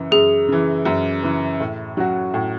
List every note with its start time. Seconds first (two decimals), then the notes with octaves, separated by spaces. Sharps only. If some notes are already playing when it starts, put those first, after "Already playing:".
Already playing: F#2 C#3 E3
0.11 F#2 G#4
0.48 C#3 E3
0.85 F#2
1.23 C#3 E3
1.60 A2
1.97 F#3 C#4 F#4
2.34 A2